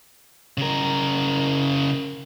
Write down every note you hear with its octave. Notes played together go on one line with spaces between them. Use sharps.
C#3 A#4